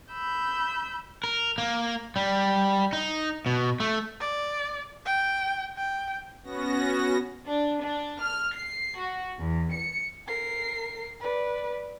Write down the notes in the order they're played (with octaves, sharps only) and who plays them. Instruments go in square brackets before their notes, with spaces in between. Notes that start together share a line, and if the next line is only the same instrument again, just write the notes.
[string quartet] B5 E6 G6
[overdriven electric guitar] A#4
A#3
G3
D#4
B2
A3
[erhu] D5
G5
G5
[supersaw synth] B3 C#4 F#4 A#6
[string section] D4
D4
F6
C7
F#4
E2
C#7
[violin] A#4 C7
B4 D5